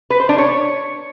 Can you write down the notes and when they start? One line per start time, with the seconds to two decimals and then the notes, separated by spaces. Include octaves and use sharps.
0.10 B4
0.20 C5
0.29 D4
0.38 C#5